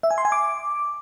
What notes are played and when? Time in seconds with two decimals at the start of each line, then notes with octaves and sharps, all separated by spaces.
0.03 E5
0.11 G#5
0.18 C6
0.25 G#5
0.32 D6